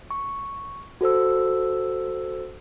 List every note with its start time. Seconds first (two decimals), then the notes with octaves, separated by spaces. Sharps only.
0.11 C#6
1.01 F#4 A4 C5 E6